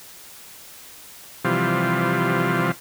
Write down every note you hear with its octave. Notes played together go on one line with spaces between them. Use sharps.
C3 E3 F3 G3 F4